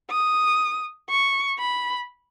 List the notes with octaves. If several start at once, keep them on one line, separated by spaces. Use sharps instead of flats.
D#6
C#6
B5